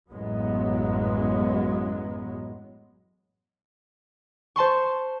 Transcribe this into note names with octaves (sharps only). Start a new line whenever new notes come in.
A1 F#2 F#3 G#3 B3
C5 A5 C6 C#6